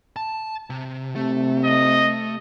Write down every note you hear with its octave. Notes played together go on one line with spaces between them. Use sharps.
A5
C3
C3 A3
D#5